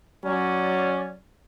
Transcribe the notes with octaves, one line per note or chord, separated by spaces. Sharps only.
F#3 C#4 D5